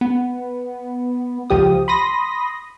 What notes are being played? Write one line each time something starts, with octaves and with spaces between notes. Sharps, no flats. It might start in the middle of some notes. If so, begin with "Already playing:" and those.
B3
C#2 F3 G4 D#6
B5 C6 D#6 A#6